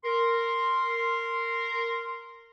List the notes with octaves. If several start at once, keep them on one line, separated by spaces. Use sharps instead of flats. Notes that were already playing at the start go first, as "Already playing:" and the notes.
A#4 C6